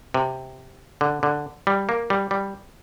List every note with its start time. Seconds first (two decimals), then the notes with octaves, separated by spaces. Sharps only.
0.14 C3
1.01 D3
1.23 D3
1.67 G3
1.89 A#3
2.10 G3
2.31 G3